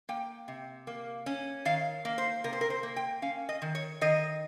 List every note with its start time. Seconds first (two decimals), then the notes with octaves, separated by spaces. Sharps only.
0.09 A#3 G5
0.48 C3
0.87 A#3
1.26 C#4
1.65 D#3 F5
2.05 A#3
2.18 C5
2.44 C3 A#4
2.53 C5
2.61 A#4
2.70 C5
2.83 A#3
2.96 G5
3.22 C#4 F5
3.49 D#5
3.62 D#3
3.75 C#5
4.01 D#3 D#5